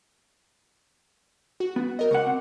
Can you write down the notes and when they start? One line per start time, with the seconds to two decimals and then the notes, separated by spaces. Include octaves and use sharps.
1.60 F#4
1.76 B3
1.99 A#4 D#5
2.11 C#2 F#5 C#6 D6
2.26 C4 F#5